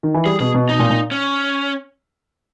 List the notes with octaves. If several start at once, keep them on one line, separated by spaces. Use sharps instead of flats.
D#3
E3
G3 G#4
B2 G#4
B2
B2 D#4
A#2
A#2
C#4